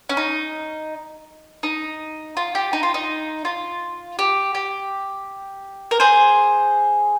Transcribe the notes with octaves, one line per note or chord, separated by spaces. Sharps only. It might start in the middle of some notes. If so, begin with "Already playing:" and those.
C#4
D#4
D#4
F4
G4
D#4
F4
D#4
F4
G4
G4
A#4
G#4 C5